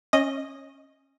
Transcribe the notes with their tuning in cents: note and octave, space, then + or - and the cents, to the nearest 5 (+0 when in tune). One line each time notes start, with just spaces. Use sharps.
C#4 -20 D#5 +0